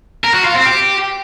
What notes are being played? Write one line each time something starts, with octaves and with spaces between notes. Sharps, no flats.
A#4
F#4
F4
C4
G4